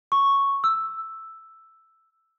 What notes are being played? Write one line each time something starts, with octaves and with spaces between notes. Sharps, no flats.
C#6
E6